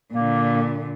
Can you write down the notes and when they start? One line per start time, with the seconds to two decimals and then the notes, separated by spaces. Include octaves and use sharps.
0.13 A#2 D3 A#3